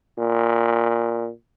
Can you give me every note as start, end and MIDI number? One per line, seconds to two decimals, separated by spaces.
0.19 1.29 46